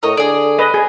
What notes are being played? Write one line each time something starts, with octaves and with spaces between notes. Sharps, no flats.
A2 A#4 C#5 D#5
D3 G#4 D5
B4 D#5
G#4